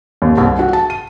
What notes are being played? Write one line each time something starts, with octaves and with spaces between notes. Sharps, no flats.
D#2
C2
F#4
A5
D#7